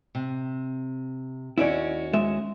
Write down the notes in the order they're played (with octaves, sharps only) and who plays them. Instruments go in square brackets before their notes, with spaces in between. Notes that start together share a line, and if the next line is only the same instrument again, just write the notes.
[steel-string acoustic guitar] C3
[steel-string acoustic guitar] D#2 C#4 F#4 [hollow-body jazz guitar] E4 D5
[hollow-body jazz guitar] G#3 E5